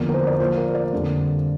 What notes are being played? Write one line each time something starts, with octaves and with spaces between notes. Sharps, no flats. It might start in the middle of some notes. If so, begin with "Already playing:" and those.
Already playing: E2 D3 F3 A#3
A#4
C5
D5
A#2 F3 A#3 C5
A#4
D5
F2 D3 G3 A#3